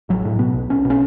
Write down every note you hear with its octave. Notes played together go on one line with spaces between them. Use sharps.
A1 F#3
A2
B2 B3
B1
B1 C#4
B2
C#4